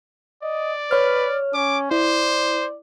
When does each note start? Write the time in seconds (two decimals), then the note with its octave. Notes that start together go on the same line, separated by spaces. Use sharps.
0.43 D5 D#5
0.91 B4 C#5 F6
1.54 C#4 D6
1.91 E4 C5 D5